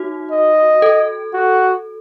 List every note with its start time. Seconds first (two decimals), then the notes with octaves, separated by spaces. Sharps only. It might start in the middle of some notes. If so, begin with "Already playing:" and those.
Already playing: D#4 F#4
0.31 D#5
0.82 A4
1.33 F#4